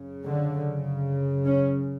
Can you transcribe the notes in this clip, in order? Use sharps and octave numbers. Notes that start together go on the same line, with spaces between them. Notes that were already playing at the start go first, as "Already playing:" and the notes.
Already playing: F#2 C#3
D3
C#4